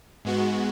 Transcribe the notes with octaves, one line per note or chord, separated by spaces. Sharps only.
G#2 G#3 B3 F#4